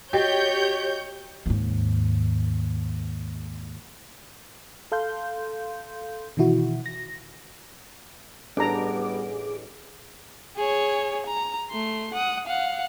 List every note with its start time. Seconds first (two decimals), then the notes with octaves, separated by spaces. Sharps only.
0.13 F#4 G4 C#5 D#5 G6 A6
1.46 D#2 G#2
4.92 A4 F5 C6 G6
6.37 B2 D#3 E3 E4 F#4
6.86 A#6
8.57 A1 G3 B3 D4 G#4 A#5 D6
10.57 G#4 C#5
11.27 A#5
11.71 A3 C6
12.14 F#5 D#6
12.47 F5 F#5